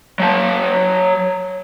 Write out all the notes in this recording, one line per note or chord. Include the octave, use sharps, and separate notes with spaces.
F#3 A5